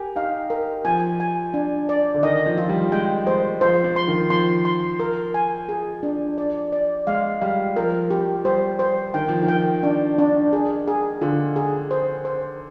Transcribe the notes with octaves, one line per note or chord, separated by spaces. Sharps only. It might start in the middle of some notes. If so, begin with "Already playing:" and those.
Already playing: G4 A#4 G#5
D#4 F5
A#4
F3 G#5
G#5
D4
D5
D3
D#3 D#5
F3
F4
G3
G#3 G5
G#3 C5
F3 C5
F3
C6
D#3
F3 C6
C6
A#4
G#5
G#4
D4
D5
D5
G#3 F5
G3 F5
F3 A#4
G4
G3 C5
C5
D#3 G5
F3
D#3
G5
D4
D4
G#4
G#4
D3 F4
G#4
C5
C5